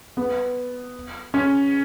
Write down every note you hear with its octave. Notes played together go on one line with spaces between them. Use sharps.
B3
C#4